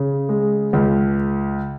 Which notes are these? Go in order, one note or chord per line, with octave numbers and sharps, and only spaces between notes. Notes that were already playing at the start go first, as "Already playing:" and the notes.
Already playing: C#3
G#3
C#2